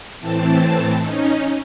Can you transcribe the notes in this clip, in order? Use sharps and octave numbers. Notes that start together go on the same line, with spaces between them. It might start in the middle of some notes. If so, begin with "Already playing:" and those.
A2 E3 C4 A5
C#4 D#4